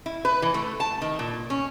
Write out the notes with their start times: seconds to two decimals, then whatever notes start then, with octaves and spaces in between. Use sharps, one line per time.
0.06 E4
0.25 B4
0.42 E3
0.54 A3
0.80 A5
1.02 D#3
1.19 A#2
1.50 C#4